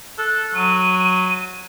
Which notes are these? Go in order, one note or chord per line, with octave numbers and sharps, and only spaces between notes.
A4 F#6
F#3 D#7